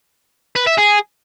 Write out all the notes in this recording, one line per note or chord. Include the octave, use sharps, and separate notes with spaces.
B4
E5
G#4